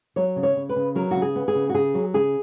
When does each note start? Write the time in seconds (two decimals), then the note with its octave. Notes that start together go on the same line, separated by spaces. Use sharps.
0.16 F#3 C#5
0.36 C#3
0.43 C#5
0.56 C#3
0.69 B4
0.76 C#3
0.95 F#3 A#4
1.11 C#3 F#4
1.22 G#4
1.35 B3
1.48 G#4
1.55 C#3
1.69 F#4
1.74 C#3 G#4
1.94 F#3
2.14 C#3 G#4